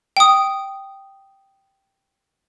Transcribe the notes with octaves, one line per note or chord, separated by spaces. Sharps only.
G5 D#6